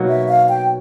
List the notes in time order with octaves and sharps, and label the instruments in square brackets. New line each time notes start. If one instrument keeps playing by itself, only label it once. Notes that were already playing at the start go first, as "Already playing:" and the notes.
Already playing: [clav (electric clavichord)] B2 F#3 A#3 D#4 F#4
[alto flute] E5
F5
G5